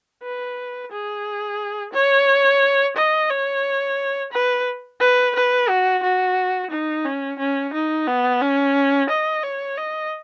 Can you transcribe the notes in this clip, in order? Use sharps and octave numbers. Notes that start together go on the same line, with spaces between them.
B4
G#4
C#5
D#5
C#5
B4
B4
B4
F#4
F#4
D#4
C#4
C#4
D#4
B3
C#4
D#5
C#5
D#5